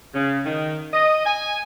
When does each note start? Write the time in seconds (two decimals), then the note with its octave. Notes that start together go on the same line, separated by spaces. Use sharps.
0.14 C#3
0.45 D#3
0.93 D#5
1.25 G#5